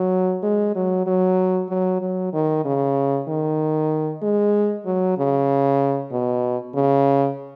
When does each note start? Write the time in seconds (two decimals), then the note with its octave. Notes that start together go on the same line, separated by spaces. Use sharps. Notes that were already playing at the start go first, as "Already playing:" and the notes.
Already playing: F#3
0.43 G#3
0.75 F#3
1.07 F#3
1.69 F#3
2.01 F#3
2.33 D#3
2.65 C#3
3.28 D#3
4.22 G#3
4.85 F#3
5.18 C#3
6.11 B2
6.75 C#3